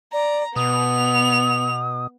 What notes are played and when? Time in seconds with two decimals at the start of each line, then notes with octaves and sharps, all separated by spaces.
0.13 D5 A#5
0.56 B2 B3 D#6 F7